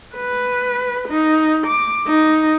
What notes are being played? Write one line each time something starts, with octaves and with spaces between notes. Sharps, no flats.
B4
D#4
D6
D#4